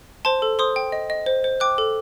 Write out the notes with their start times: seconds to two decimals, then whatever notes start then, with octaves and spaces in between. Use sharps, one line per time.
0.25 C5 A5 C6
0.42 A4
0.59 C5 C6 D#6
0.76 G5
0.92 D#5
1.10 D#5
1.26 C5
1.44 C5
1.60 G5 D6 F#6
1.78 A4